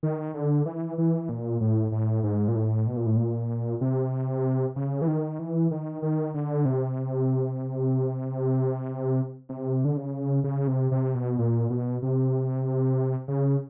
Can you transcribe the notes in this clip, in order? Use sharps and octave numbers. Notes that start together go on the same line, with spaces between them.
D#3
D3
E3
E3
A#2
A2
A2
G#2
A#2
A2
B2
A#2
A2
A#2
C3
C#3
E3
D#3
E3
D#3
D#3
D3
C3
C3
D3
C#3
C#3
C3
C3
B2
A#2
B2
C3
C#3